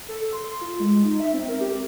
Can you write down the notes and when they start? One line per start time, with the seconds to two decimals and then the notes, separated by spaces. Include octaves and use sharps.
0.09 A4
0.33 C6
0.61 F4
0.80 G#3
1.04 D#4
1.20 E5
1.33 C4
1.48 A#4
1.61 G4